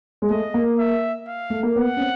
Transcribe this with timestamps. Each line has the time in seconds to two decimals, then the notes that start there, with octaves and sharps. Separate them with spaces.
0.22 G#3
0.30 A3 D#5
0.54 A#3
0.79 E5
1.27 F5
1.50 A3
1.63 A#3
1.76 B3 F#5
1.96 C#4
2.00 C4